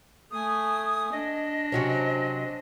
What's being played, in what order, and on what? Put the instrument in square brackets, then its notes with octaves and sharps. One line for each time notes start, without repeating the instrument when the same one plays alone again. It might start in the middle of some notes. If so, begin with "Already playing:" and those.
[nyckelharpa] A3 G#5 [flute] D#6
[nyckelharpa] D4 [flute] D#5
[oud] C3 F#3 C#4